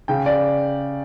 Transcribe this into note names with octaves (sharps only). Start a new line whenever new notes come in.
C#3 G5
D5